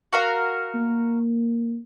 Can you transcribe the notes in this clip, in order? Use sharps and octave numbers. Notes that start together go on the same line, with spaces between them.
F#4 A#4 F5
A#3